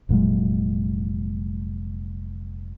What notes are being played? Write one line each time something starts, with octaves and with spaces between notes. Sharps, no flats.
F1 A#2 F#3 G#3